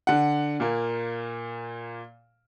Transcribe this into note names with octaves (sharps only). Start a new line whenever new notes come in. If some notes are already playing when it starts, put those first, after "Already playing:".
D3 F#5
A#2 A#3